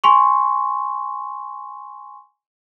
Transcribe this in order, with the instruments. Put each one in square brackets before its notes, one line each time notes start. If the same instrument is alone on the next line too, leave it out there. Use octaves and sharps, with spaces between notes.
[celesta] G#5 C6 C#6